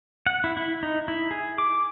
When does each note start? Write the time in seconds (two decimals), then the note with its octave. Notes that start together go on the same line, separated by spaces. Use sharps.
0.26 F#5
0.44 E4
0.57 E4
0.83 D#4
1.08 E4
1.31 G#4
1.58 D6